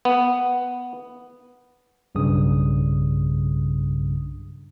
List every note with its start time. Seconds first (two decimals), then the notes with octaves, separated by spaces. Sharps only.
0.05 B3
2.15 B1 G2 C#3 D#6